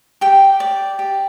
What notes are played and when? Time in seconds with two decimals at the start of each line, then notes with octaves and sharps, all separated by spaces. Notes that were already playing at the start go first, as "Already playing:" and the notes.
0.21 G4 G5
0.60 D5
0.99 G4